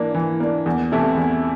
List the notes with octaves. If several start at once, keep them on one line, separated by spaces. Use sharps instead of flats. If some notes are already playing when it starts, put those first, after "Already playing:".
Already playing: E3 A#3 D4
E3
A#3 D4
E2
C3 E3 A3 E4
E2